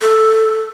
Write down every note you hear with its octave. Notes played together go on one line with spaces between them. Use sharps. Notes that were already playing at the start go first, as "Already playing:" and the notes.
A4